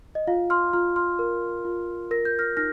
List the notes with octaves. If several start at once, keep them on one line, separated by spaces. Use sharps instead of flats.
D#5
F4 F5
C6 F6
F4 C6 F6
C6 F6
A#4
F4
A#4 A#6
G6
F6 A#6
D#4 F6 A#6